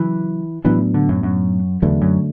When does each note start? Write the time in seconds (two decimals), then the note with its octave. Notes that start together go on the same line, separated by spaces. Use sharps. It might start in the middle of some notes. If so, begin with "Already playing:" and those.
Already playing: C#3 E3 F#3
0.65 A2 E3 F#3 B3 D4
0.94 D3
1.09 F#2
1.23 F#2
1.82 E2 D3 F#3 A3 D4
2.02 F#2